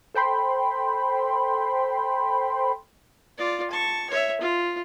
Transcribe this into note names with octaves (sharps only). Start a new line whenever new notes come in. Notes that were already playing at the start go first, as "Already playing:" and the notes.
A4 C5 G5 B5 C6
F4 D5
A5 C#6
C#5 E5
F4